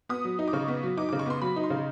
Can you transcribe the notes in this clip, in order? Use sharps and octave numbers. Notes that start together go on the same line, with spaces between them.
B3 D#6
F#3
D#4
D6
C#3 C#6
B3
F#3
D#4 D6
D6
C#3
C#6
B3 C6
F#3 B5
D#4
C6
C#3